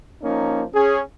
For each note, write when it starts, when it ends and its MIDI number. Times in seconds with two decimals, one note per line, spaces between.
0.23 0.63 53
0.23 0.63 58
0.23 0.63 61
0.23 0.63 63
0.73 1.00 61
0.73 1.00 68